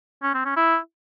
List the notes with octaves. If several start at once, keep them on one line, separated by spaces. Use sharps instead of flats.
C#4
C4
C#4
E4